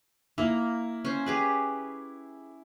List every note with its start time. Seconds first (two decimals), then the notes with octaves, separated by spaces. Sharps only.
0.38 A#3 E4
1.05 C#4 C5
1.26 G4 G#4 B4